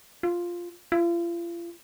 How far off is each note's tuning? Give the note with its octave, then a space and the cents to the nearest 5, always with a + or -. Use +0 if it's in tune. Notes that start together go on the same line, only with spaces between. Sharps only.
F4 +0
F4 -40